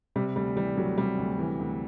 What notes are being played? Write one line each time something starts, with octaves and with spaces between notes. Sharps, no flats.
C3 G3
D2 G3
E3 G3
D2 F#3
C3 G3
D2
E3
D2